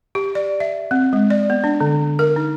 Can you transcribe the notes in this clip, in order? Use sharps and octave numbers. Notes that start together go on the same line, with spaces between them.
G4
D5
E5
C4
G#3
D5
B3
D4
D3
A#4
D#4